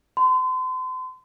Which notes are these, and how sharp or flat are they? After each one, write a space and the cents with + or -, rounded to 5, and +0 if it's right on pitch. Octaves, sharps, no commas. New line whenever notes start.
C6 -40